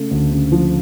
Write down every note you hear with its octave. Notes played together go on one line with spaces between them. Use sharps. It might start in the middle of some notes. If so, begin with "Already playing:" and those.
Already playing: C#3 A3
D2
C#3
F3